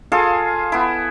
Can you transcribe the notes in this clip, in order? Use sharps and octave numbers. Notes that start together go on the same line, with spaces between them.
F4 G#4 A4 F5
B3 E4